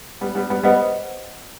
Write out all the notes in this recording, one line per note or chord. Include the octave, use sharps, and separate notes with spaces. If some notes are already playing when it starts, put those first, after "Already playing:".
G3 B3
G3 B3
G3 B3
G3 B3 C5 D#5 F#5